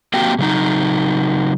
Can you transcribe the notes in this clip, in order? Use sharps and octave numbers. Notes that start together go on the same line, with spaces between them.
A#3 C4 F#4 G4 G5
C#3 F#3 D#4